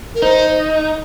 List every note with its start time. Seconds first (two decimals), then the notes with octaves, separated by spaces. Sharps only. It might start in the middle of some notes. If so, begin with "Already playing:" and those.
0.15 A#4
0.22 D#4 C5